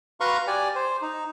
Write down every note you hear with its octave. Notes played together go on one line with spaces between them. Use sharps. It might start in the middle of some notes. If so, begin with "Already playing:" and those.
F#4 B4 F5 A#5 C6 C#6
G4 D5 G#5
C5
D#4